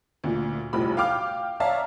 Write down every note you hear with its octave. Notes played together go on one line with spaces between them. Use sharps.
D2 A#2
F1 B1 A2 F3 G3 B5
F5 G5 D6 F6
C#5 D5 E5 F5 A5 A#5